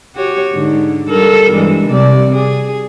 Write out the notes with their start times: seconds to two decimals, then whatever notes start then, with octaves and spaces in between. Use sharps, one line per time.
0.15 F#4 G4 C#5
0.54 G#2 D3
1.09 G3 A4 A#4
1.53 G2 E3 G#3
1.88 C3 G3 D5
2.34 G#4